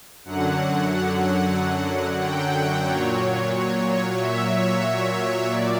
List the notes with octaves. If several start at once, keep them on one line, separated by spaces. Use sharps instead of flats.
F#2 D3 F#3 F#5
G5
A#2 F#3 C#5
E5
C#5
C#5
A#2 D5